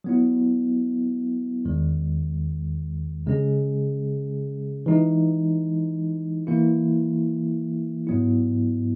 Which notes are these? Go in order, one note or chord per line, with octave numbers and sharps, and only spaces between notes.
F#3 B3 E4
E2 D#3 G#3
C#3 G#3 C#4 G#4
E3 G#3 D#4
E3 A#3 E4
G#2 F#3 B3 E4